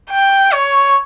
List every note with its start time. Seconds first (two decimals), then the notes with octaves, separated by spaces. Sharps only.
0.10 G5
0.52 C#5